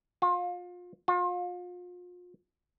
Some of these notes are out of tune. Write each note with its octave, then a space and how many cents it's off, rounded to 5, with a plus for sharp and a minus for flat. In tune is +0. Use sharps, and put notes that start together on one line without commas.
F4 +30
F4 +35